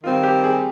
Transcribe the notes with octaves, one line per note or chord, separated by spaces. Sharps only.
D#3 G3 C4 F4
G4
G#4